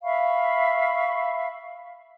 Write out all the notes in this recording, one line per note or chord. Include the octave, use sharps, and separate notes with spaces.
E5 F5 B5 C#6